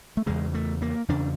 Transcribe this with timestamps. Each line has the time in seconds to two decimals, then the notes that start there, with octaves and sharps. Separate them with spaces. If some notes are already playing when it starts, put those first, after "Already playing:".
0.17 A3
0.26 E2 C#3 G#3
0.54 A3
0.82 A#3
1.08 E2 C#3 D4